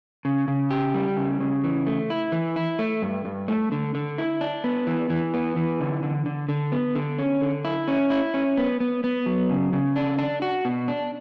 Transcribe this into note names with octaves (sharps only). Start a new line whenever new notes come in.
C#3
C#3
G4
G3
C#3
C#3
E3
A3
E4
E3
E4
A3
G2
G2
A3
D3
D3
E4
D4
B3
E3
E3
B3
E3
D3
D3
D3
D3
B3
D3
C#4
D3
E4
C#4
E4
C#4
B3
B3
B3
F#3
C#3
C#3
D4
D4
F#4
B2
D4